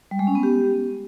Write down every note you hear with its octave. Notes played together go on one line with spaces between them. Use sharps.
G3
G#3
C#4
B3
G4